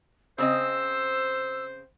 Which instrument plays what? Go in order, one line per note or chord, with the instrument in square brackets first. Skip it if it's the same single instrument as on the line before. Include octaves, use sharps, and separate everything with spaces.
[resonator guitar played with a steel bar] C#3 C4 D#5 [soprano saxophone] C5 [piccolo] E6